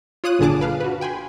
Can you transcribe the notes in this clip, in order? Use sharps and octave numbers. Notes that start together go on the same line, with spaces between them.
F4 C#5 D#6 F#6 D#7
G1 A#2 D3 G#4 A5 D6
B4 F5
F#4 B4
G5 G#5 B5 C6